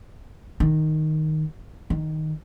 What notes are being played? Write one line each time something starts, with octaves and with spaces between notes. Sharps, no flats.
D#3
D#3